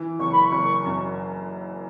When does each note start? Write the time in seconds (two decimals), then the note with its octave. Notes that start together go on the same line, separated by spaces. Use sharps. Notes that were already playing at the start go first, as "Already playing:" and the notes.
Already playing: E3
0.19 F#1 C#6
0.32 B5
0.45 C#6
0.52 F#1
0.85 F#2